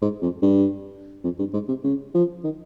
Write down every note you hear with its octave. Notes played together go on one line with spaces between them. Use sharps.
G#2
F2
G2
F2
G2
G#2
C3
C#3
F3
D#3